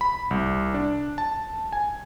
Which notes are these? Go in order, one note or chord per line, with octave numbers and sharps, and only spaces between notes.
B5
C2
D4
A5
G#5